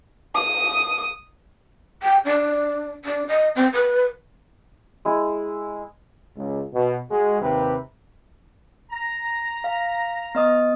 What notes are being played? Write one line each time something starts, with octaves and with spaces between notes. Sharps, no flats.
D#6
G5
D4
D4
D#5
C4
B4
G#3 E4
C#2
B2
G#3 F#4
D#2 C3 G4 B4
A#5
F5
B3 D#5 D#6